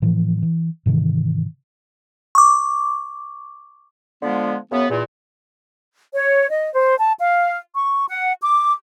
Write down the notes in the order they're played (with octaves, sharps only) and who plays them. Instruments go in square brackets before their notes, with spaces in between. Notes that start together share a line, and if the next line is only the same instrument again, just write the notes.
[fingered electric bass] A2 E3 F3
E3
G#2 C3 D#3 E3
[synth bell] C#6 D6
[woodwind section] D3 F3 G#3 B3
F#2 C#3 B3
E2 A#2
[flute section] C#5
D#5
C5
A5
F5
C#6
F#5
D6